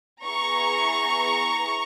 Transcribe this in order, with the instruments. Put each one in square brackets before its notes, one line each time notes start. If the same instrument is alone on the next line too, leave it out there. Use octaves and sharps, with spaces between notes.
[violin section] B3 E4 G#4 A#5 C#6